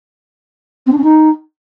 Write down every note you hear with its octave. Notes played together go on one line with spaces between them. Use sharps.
C4
D4
C#4
D#4